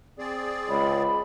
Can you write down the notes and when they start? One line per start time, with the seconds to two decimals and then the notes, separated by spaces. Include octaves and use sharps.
0.19 C4 G#4 D5
0.69 C#2 B5